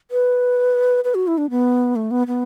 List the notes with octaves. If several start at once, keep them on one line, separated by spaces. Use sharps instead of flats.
B4
B4
F#4
E4
D4
B3
A3
B3
B3